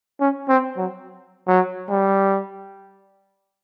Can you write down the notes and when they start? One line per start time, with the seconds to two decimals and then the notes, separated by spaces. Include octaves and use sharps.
0.21 C#4
0.49 C4
0.77 F#3
1.48 F#3
1.89 G3